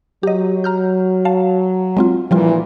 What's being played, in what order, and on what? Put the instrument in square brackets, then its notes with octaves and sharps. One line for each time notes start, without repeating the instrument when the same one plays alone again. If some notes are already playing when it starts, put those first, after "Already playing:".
[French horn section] F#3 [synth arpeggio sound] G4 D#5
[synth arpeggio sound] A#5 F6 G6
F5 A5
G#3 C4 F4
[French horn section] D2 A#2 E3 [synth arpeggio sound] F3 G3 F4